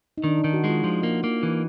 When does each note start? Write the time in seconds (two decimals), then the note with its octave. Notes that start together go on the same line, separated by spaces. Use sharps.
0.18 D#4
0.24 D#3 D4
0.38 D#4
0.44 D#3
0.53 F#4
0.64 G#3
0.69 F4
0.84 F3
1.03 A#3
1.24 A#3
1.43 E3